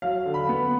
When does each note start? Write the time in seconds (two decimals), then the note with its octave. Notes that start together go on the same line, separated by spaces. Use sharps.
0.02 F#3 F5
0.25 D3
0.34 B5
0.49 B3